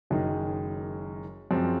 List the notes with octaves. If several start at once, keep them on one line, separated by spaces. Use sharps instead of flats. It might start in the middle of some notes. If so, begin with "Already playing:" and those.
F#1 F#2 D#3 G#3 D#4
F#2 F3 G#3 C4